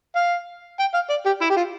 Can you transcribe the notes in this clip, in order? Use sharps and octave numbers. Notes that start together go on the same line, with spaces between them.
F5
G5
F5
D5
G4
E4
G4
F4